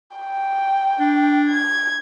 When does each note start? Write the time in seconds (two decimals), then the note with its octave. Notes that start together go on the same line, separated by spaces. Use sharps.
0.17 G5
1.00 D4
1.48 G#6